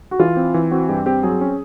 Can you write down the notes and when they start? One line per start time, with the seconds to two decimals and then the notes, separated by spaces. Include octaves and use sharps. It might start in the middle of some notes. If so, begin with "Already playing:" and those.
0.11 F#4
0.19 E3 F4
0.37 C4
0.54 E3
0.71 C4 F#4
0.89 G2 G4
1.06 C4 G4
1.23 F#3 G#4
1.41 C#4